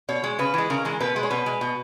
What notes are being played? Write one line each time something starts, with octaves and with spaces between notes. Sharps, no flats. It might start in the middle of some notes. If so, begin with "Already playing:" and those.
B2 C#5
G#3
C#3 B4
E3 G#3
C#3 A#4
E3 G#3
B2 B4
G#3
C#5
B2 B4
G#3
B2